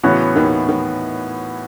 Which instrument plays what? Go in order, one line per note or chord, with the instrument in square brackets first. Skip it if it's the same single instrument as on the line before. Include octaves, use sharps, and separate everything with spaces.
[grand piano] A2 E3 B3 F#4 C#5 [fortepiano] C#3
[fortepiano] D#2 D#3
D#3